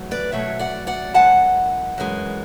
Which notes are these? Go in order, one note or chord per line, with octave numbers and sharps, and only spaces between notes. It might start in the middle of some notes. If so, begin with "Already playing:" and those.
Already playing: E2 F#3 A3
B4 D5
E2 B2 F#3 A3 C#5 E5
D5 F#5
D5 F#5
F#2 E3 G#3 F#5 A5
F#2 E3 G#3